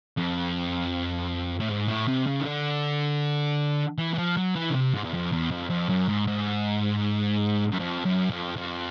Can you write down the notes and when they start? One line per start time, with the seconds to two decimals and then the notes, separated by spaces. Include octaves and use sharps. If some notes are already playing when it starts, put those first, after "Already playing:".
0.18 F2
1.61 A2
1.70 G#2
1.89 A2
2.08 C3
2.27 C#3
2.41 D#3
2.46 D3
3.98 E3
4.14 E3
4.18 F3
4.37 F#3
4.56 E3
4.70 C#3
4.74 C3
4.94 G#2
5.04 E2
5.14 F2
5.32 E2
5.51 F2
5.70 F2
5.89 F#2
6.09 G#2
6.27 G#2
7.72 F#2
7.80 F2
8.05 F#2
8.30 F2
8.56 F2